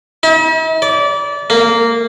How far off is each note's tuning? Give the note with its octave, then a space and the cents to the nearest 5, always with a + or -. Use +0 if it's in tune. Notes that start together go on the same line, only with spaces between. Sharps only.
E4 -45
D5 -25
A#3 -15